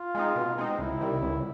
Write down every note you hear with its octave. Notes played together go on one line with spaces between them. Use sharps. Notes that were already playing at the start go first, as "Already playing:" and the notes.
Already playing: F4
G#3 C4 D#4
B2
G#3 C4 D#4
C#2 E4
C3 D#3 G3
C#2